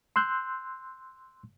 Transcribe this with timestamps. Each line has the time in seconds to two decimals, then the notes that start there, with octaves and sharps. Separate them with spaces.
0.16 C6 E6 F#6 G6